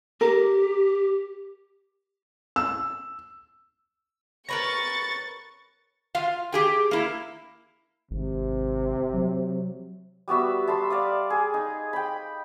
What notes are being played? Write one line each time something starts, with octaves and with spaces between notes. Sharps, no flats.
G4 A#4
E6
A#4 B4 C#5 B5 C#6 A6 A#6
F4 F5
G4 G#4 G5
A#3 E4
G#1 C3
F#3
G3 B3 F#4 E5
E5 A5 B5 C6
D5 F5 D#6
G#4
D#4
G5 B5